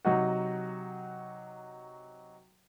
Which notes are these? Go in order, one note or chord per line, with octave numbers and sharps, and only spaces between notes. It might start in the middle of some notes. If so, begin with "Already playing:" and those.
C3 F#3 D#4 F#4